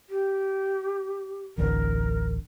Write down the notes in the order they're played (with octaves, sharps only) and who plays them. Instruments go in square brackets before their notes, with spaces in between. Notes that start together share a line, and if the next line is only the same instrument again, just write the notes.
[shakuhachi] G4
[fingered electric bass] D1 A1 D3 [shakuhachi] A#4